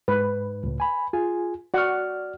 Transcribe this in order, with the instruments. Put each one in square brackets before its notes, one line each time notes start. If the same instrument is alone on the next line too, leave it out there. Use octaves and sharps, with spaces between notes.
[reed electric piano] G#2 [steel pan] B4
[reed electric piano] C#2 A2
G#5 B5
F4 G#4 G#5
[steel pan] F#4 F#5 [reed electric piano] D5 F6